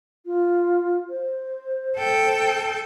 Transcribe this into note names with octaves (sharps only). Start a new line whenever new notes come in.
F4
C5
A4 G5